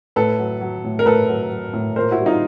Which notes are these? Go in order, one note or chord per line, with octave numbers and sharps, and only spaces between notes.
A2 A4 B4
F#3
F#3
A2
A#4
A2 A4 B4
F#3
F#3
A2
A#2 A#4 C5
E4 F#4
G3
D#4 F4